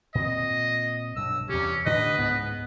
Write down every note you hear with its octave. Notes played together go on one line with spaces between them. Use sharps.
A#2 C4 D#5
B1 G2 F#3 E6
E2 C3 C#4 G4
A2 D3 D4 B4 D#5
C#2 G#2 C#3 B3